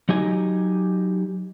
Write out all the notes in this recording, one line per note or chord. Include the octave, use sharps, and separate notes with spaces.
F#3 D#4 G4 D#5 G#5